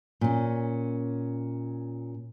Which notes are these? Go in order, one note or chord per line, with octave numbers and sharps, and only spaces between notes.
A#2 C#4